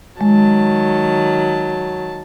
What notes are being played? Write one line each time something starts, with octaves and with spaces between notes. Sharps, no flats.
D#3 F#3 G#3 A5